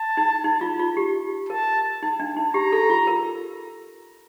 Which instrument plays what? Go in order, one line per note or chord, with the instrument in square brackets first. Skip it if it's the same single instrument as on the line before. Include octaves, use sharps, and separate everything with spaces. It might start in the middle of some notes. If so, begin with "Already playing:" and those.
Already playing: [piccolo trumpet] A5
[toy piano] D#4
D#4
F4
F4
G4
[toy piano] A#4 [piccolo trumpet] A5
[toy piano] D#4
D4
D#4
[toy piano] G4 [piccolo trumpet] A#5
[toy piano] A4
F4
A#4